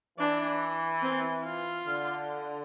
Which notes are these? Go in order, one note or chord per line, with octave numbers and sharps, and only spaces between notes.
E3 D4
C4
F4
D3